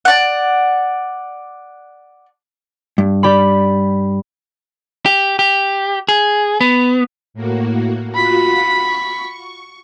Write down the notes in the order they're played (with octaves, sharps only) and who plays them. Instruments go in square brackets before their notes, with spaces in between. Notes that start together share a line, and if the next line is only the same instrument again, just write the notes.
[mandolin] D5 F#5
[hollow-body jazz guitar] G2
[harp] G4 D5 B5
[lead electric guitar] G4
G4
G#4
B3
[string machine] A2 A#3 F#4
[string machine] F4 F#4 F#5 [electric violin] B5 B6
[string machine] C#6